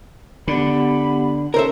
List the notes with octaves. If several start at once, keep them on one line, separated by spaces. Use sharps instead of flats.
D3 B3 G4 F#5 B5
C#4 A4 A#4 C5 C#5 E5